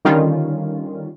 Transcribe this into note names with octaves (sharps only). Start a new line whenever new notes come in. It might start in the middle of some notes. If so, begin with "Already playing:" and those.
D3 D#3 G3 C#4 F4